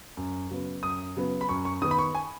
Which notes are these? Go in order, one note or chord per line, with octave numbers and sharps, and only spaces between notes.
F#2
C#3 F#3 B3
F#2 D#6
C#3 F#3 B3
B5
F#2 C#6
C#6
D#3 B3 D#6
B5
C#6
G#5